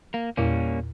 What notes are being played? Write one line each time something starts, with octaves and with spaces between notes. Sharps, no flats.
A#3
E2 A#2 G3 A#3 C#4 E4